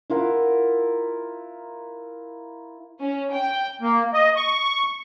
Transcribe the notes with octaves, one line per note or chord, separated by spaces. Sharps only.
E4 F4 A#4 F#5
C#4
G5
A#3
D#5
C#6